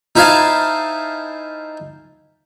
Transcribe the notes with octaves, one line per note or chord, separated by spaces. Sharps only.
D#4 E4 C5 F5 G#5 A5